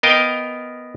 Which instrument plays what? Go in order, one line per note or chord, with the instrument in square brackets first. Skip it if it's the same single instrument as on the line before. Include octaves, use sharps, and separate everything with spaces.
[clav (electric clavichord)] B3 A#4 D#5 F5 G5